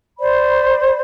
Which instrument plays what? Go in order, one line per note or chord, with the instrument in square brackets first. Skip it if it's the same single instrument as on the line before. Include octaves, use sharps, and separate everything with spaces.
[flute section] C5 D5 B5